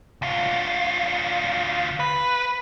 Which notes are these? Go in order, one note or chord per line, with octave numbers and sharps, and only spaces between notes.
D2 F4
B4